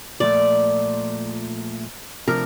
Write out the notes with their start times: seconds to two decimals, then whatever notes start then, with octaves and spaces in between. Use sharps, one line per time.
0.20 A#2 F3 A3 D5
2.28 C3 F3 A3 D4 A#4